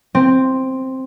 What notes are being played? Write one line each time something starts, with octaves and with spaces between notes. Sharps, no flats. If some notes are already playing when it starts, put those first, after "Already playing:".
C4